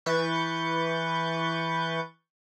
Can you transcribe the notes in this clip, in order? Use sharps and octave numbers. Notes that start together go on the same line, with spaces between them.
E3 B4 C#6 G6 A6